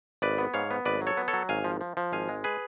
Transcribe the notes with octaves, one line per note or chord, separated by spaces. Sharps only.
G#1 B4 D5
B3
G#2 C#5 F5
B3
G#1 B4 D5
F#3
A4 C#5
B3
A4 C#5
F#3
G#1 F5 G#5
F3
F3
F3
G#1 F5 G#5
G#3
G#4 B4